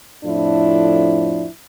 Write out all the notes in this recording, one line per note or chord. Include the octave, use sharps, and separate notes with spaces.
F2 A2 F3 D4 E4